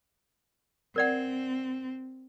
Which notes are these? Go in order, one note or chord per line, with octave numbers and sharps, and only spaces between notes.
C4 A#4 D5 F#5